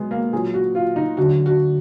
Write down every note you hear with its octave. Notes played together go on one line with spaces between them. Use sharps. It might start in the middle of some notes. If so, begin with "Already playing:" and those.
Already playing: B2 F#3 G#3 B3
A#3
A#2 F#3 G#4
F#4
F4
D#4
D3 F#3 F#4
F#4